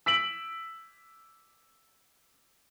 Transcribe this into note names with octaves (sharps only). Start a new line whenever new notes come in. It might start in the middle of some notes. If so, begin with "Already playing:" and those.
E6 B6 D7 F#7